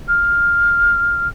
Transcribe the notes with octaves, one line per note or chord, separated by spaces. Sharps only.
F6